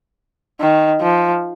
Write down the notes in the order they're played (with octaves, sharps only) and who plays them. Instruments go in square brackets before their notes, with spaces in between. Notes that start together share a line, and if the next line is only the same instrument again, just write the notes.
[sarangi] D#3
F3